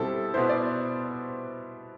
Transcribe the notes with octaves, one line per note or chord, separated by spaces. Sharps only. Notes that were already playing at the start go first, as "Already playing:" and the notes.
Already playing: B2 G3 C4 E4 A4
B2 B3 E4 C5
D5